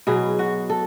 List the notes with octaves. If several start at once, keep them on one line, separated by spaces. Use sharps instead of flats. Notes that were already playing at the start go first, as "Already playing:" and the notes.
B2 F#3 G#4
F#4
A4